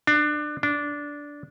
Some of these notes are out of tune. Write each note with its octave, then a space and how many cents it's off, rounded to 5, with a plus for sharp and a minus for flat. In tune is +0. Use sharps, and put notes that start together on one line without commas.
D4 +25
D4 -10